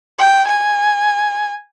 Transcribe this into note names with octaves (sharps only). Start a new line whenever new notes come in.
G5
G#5